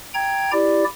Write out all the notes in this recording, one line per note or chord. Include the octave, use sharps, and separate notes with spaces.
G5 A#5 G#6
E4 G4 D5